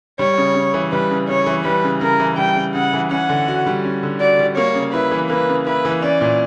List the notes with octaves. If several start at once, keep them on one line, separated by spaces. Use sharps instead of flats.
G3 C#5
C#3
C#3
E3
G3 B4
C#3
C#3 C#5
E3
G3 B4
C#3
C#3 A#4
E3
G3 G5
C#3
C#3 F#5
E3
C#4 F#5
D3
F#4
G3
C#4
D3
F#4 D5
G3
A#3 C#5
C#3
E4 B4
E3
A#3 B4
C#3
E4 B4
E3
C#4 D5
A#2